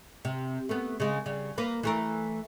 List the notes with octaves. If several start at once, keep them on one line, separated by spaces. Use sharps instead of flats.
C3
A3 B3
C#3 G#3
C#3 G3
A#3 B4
E3 A3 A#4